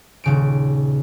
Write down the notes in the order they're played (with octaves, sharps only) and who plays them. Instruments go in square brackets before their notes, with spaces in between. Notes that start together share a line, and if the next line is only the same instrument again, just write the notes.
[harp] D#1 C#3 D7